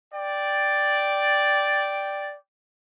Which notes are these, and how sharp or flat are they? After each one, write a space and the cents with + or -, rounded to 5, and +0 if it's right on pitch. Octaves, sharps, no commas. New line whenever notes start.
D5 +0 G5 +0